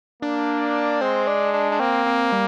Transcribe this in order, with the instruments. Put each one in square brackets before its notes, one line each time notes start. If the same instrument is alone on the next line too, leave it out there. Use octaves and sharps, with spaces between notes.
[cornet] A#3 [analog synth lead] D4
[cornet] G#3 [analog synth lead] C4
[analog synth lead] D4
D4
D4
[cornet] A#3 [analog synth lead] C4
[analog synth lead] C4
G3